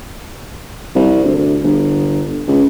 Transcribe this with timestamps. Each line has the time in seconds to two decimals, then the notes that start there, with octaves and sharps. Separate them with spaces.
0.95 C2
1.24 D2
1.64 G1
2.48 C#2